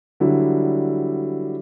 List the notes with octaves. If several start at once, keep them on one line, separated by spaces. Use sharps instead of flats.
D3 F#3 G3 E4